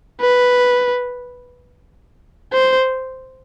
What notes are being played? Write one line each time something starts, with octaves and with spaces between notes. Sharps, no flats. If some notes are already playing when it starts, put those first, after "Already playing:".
B4
C5